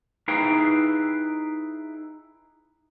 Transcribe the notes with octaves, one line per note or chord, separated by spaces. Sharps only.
D#4 E4 G#4 B4 F5 G5